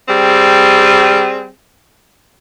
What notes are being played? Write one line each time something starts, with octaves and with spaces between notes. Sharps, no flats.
G3 C4 G#4